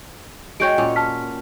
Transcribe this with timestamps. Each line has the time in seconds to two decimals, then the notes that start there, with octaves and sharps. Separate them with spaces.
0.60 G#3 F#4 C#5 G5 G6 D7
0.78 A#2 C#4
0.96 A5 F6 B6